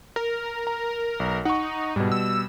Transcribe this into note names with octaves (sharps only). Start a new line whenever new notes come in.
A#4
A#5
B1
D#4 F#5 C#6
G#2 B2 G3
E6